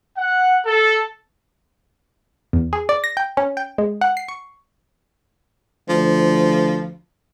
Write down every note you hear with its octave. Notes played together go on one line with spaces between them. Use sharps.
F#5
A4
E2
G#4
D5
A#6
G5
C#4
G5
G#3
F#5
C7
C#6
D2 F3